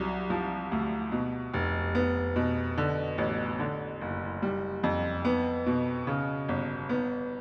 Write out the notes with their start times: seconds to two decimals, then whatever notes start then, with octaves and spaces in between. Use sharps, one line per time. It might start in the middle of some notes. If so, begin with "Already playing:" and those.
Already playing: C2 F#3
0.30 F3
0.72 D2
1.12 B2
1.54 F1
1.95 B3
2.36 B2
2.78 D3
3.18 A1
3.60 D3
4.01 F#1
4.42 G3
4.84 F2
5.25 B3
5.66 B2
6.07 C#3
6.49 G1
6.89 B3